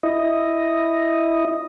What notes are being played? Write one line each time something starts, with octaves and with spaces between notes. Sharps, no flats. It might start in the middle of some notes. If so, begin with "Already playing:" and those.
E4 D#5